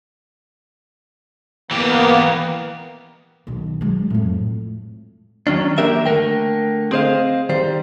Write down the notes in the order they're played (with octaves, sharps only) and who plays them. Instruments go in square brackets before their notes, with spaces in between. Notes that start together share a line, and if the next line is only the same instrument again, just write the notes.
[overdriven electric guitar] E3 G4 [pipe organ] A#3 B3
[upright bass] B1 D#3
F#3 G#3
F2 A2
[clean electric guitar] D#3 F#3 C#4 D4
D#3 A#3 D4 G4 A#4 E5
D3 A3 A#4 G5
C4 G#4 C5 D#5 F5
D#3 G3 C5